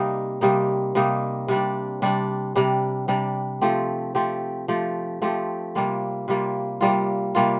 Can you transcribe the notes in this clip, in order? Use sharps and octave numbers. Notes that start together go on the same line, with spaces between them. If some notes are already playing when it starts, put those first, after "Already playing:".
Already playing: C3 G3 A#3 D#4
C3 G3 A#3 D#4
C3 G3 A#3 D#4
C3 G3 D4
C3 G3 D4
C3 G3 D4
C3 G3 D4
F3 A3 C4 G4
F3 A3 C4 G4
F3 A3 C4 G4
F3 A3 C4 G4
C3 G3 A#3 F4
C3 G3 A#3 F4
C3 G3 A#3 F4
C3 G3 A#3 F4